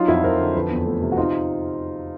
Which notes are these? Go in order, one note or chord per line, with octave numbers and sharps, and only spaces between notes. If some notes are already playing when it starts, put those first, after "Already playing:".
Already playing: F#3 D#4 F4
F2 E4 F#4
F2 A#4 C5
D3
F3 A4 B4
E2
A3
C3
F#4
C4 D#4 F4